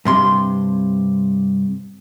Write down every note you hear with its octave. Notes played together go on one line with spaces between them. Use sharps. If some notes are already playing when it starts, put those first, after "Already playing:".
G2 C3 C6